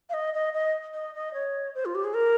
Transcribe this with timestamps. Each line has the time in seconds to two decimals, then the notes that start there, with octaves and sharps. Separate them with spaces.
0.10 F5
0.13 D#5
0.34 D#5
0.53 D#5
0.94 D#5
1.15 D#5
1.34 C#5
1.75 C5
1.85 F4
1.95 G4
2.04 G#4
2.14 A#4